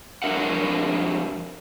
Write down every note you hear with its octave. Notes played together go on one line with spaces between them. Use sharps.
F2 E3 D4 A#4 E5 F#5